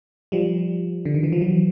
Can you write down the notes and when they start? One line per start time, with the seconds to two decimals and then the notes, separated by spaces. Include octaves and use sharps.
0.32 F3 G3
1.05 D3
1.14 D#3
1.23 E3
1.32 F3
1.41 E3 F#3